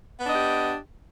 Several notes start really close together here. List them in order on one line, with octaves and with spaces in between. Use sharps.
B3 D4 D#5 G4